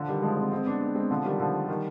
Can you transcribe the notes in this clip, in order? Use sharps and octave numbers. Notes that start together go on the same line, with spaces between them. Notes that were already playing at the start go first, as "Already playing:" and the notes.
Already playing: D3 F3
D#3 G3
F3 G#3
G#3 C4
G#3 C4
B3 D4
B3 D4
G#3 C4
D3 F3
D#3 G3
D3 F3
D#3 G3